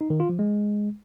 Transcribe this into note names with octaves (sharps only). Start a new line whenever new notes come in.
D#4
D#3
F4
F3
G#3